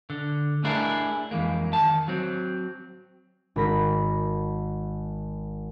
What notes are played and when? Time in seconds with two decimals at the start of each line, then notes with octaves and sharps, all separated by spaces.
0.10 D3
0.64 A3 D4 E4 G#4 A#4
1.31 F2 E3 G#3 A#3
1.73 D#3 A5
2.08 F#3 C4
3.56 G#1 A#4 B5 A#6